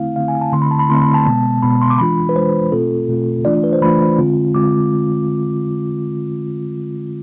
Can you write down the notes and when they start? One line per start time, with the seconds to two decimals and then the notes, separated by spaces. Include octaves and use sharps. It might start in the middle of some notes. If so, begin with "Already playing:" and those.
Already playing: D3 A3 C4 E4 F5
0.16 D3 A3 C4 E4 F5
0.28 G#5
0.41 A5
0.53 D3 A3 C4 E4 C6
0.62 B5
0.71 A5
0.79 B5
0.89 D3 A3 C4 E4 C6
1.02 B5
1.14 A5
1.26 B2 G#3 B3
1.62 B2 G#3 B3 B5
1.82 C6
1.90 D6
1.99 E3 G#3 D4 F4 B5
2.29 B4
2.35 E3 G#3 D4 F4 C5
2.72 B2 A3 C4 F4 A4
3.09 B2 A3 C4 F4
3.45 E3 A3 D4 F4 D5
3.64 B4
3.73 C5
3.81 E3 A3 D4 F4 B5
4.19 D3 G#3 C4 F4
4.55 D3 G#3 C4 F4 D6